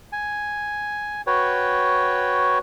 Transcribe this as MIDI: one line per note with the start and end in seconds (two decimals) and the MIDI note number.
0.13 1.21 80
1.27 2.58 66
1.27 2.58 71
1.27 2.58 73
1.27 2.58 79